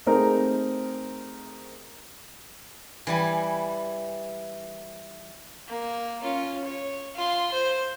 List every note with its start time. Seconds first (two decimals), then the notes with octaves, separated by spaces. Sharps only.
0.06 A3 C4 D#4 G#4 A#4
3.07 E3 G3 G#5
5.68 A#3
6.22 C#4 F4
6.65 C#5
7.15 F4 C6
7.53 C5